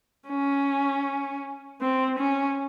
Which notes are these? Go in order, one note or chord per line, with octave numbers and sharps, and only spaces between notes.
C#4
C4
C#4